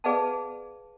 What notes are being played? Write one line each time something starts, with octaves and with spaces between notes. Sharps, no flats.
G#4 B4 D5 F5 F#5 A5